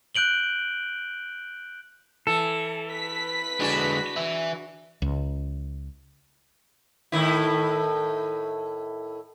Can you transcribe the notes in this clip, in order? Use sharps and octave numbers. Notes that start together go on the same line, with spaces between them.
F#6 G6 D7 F#7 G7
E3 A4
B4 B6
D3 G#3 D4 F#4 G#4
E3 E4
C#2
A2 D#3 E4